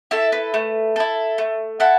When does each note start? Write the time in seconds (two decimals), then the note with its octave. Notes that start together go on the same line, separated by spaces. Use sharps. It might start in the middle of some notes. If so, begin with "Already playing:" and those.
0.11 E4 A4 E5
0.32 B4
0.54 A3
0.96 E4 A4
1.38 A3
1.80 E4 A4 F#5